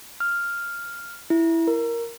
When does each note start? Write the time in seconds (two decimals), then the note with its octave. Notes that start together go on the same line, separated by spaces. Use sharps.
0.20 F6
1.30 E4
1.67 A#4